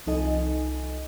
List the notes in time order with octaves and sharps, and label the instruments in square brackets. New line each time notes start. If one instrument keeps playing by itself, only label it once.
[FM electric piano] C2 F3 D#4 A4 D#5 G#5